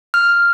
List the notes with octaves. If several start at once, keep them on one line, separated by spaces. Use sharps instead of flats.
F6